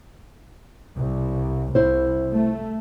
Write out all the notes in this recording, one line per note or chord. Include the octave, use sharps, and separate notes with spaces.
C2
C2 E4 C5
A3